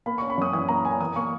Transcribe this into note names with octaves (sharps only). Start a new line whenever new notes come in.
A#3 B5
C#4 C#6
B5
F#2 D#6
E3 D#6
A#3 A#5
C#4 G#5
E3 D#6
A#3 C#6